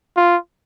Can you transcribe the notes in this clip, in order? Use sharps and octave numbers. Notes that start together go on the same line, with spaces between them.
F4